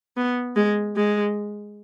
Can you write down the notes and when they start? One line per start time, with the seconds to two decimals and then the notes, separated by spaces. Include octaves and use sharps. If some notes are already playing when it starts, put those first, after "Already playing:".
0.17 B3
0.56 G#3
0.96 G#3